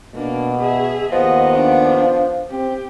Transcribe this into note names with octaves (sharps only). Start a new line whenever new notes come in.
B2 A#3 D4
G#4 E5
D#2 F3 B3 D#5
D4
C4 G4